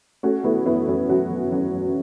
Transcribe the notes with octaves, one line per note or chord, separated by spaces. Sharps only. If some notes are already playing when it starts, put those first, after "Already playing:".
A3 C#4 F#4
A3 B3 E4
F#2 B3 E4
F#2 C#4 F#4
F#3 C#4 F#4
F#3
F#3 C#4 F#4
F#2